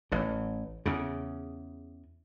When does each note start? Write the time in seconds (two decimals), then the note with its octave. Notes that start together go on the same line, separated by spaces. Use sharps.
0.12 A1 A2
0.86 E2 C#3